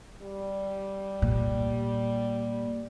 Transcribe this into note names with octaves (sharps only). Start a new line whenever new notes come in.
G3
A#2